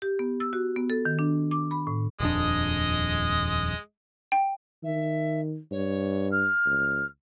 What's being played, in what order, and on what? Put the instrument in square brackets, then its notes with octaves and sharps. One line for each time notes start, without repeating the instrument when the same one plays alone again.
[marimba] G4
B3
E6
F#4
B3
A4
D#3
D4
D6
B5
A2
[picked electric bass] D#1 F2 D4 [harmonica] G#3 D#5
[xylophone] G5
[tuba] D#3 [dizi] E5
[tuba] G2 [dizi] C#5
[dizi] F6
[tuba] C#2